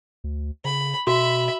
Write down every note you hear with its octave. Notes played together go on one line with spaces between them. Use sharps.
D2
C#3 B5
B2 F#4 E5 B5